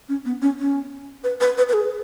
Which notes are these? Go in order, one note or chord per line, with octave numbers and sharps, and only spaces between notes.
C#4
B3
C#4
C#4
B4
B4
B4
B4
G#4